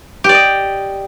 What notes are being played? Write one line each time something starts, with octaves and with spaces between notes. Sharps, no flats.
G4 D5 D#5